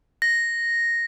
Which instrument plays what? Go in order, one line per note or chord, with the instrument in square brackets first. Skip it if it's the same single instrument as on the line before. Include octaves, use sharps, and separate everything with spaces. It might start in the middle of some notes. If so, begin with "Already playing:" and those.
[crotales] A#6